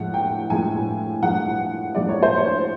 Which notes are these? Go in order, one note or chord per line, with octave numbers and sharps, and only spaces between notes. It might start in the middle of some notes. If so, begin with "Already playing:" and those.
Already playing: A2 F3 G#3 F#5
G5
A2 F3 G#3 G#5
A2 F3 G#3 F#5
A2 F3 G#3 D5
C#5
C5
C#5